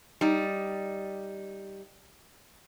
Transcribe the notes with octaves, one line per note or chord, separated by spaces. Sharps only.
G3 D#4